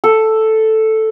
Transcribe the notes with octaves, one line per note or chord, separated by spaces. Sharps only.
A4